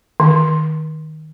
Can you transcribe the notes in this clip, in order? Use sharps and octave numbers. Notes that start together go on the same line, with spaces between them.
D#3